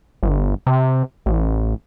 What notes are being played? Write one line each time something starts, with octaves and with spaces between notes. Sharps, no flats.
G1
C3
A1